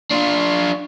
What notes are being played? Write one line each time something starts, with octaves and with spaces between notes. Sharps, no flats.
D4 F4